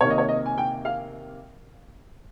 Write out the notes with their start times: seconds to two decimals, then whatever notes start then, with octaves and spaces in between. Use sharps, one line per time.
0.01 C3 D#3 A#3 C#5
0.10 D#5
0.18 C#5
0.28 D#5
0.46 G#5
0.58 G5
0.85 F5